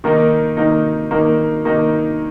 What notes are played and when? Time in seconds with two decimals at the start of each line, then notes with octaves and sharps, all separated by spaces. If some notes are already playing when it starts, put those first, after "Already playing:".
0.04 D#3 A#3 D#4
0.57 D#3 A#3 D#4
1.11 D#3 A#3 D#4
1.65 D#3 A#3 D#4